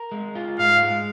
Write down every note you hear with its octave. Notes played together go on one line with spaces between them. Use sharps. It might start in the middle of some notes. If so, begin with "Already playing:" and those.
Already playing: A#4
G#3
F4
G#2 F5
G#3